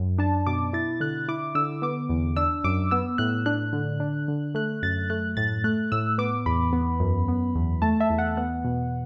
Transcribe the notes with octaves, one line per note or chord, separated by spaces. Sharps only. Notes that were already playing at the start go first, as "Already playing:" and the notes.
Already playing: F#2
D4 A5
B2 D6
E4 A6
D3 F#6
E4 D6
D3 E6
B3 D6
E2
D4 E6
F#2 D6
B3 E6
A2 F#6
D4 F#6
D3
D4
D3
A3 F#6
F#2 A6
A3 F#6
A2 A6
A3 F#6
A2 E6
B3 D6
E2 B5
B3
F#2
B3
E2
A3 A5
E5
E2
F#5
B3 F#5
B2